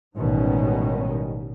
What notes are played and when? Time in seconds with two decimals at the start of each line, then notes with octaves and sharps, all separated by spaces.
0.17 A1 G#2 B2 D#3 G3 C#4